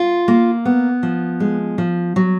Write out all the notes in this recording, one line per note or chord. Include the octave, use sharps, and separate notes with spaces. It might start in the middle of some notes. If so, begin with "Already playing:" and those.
Already playing: F4
A#3
B3
F3
G#3
F3
F#3